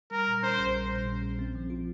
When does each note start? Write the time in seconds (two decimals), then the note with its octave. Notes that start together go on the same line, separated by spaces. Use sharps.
0.11 G3 A#4
0.27 A#2
0.43 C#4 C5
0.59 A#1
0.75 G3
0.91 A#2
1.07 C#4
1.22 A#1
1.39 C4
1.55 F3
1.70 F4